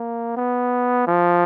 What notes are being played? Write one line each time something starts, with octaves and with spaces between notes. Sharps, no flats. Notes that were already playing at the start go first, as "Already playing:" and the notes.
Already playing: A#3
B3
F3